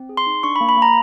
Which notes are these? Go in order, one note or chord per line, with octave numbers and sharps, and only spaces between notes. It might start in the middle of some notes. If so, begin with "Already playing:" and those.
Already playing: C4
G#4
C6
D#4
D4 C#6
B5
A#3
B5
A#3
A#5